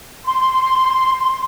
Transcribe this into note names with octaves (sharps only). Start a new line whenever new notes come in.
C6